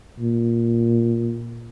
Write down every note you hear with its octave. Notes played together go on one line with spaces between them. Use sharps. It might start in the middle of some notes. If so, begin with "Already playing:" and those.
A#2